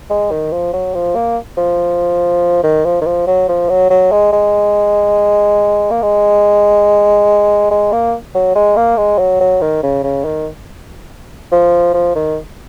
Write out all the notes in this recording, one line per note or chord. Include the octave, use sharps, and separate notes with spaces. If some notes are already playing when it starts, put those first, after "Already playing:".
G#3
D#3
F3
F#3
F3
A#3
F3
D#3
F3
D#3
F3
F#3
F3
F#3
F#3
G#3
G#3
A#3
G#3
G#3
A#3
F#3
G#3
A#3
G#3
F#3
F#3
D#3
C#3
C#3
D#3
F3
F3
D#3